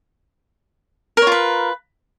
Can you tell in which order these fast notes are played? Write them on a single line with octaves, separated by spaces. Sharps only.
A#4 C#5 F4 B4